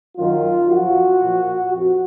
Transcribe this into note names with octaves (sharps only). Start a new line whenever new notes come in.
F#2 D#3 F#3 F4
F#2 F3 F#4
A#2 F3
F2 F3 F#4